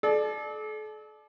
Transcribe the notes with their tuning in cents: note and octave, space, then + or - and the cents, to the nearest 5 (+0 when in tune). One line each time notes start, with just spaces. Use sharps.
A4 -40 D5 +20